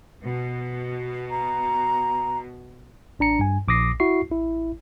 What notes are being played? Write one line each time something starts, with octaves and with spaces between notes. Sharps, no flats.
B2
A#5
A1 D4 A#5 C#7
G2 G#5
A#1 D6 D#6 A#6 C7
E4 F#4 C#6 C7
A1 E4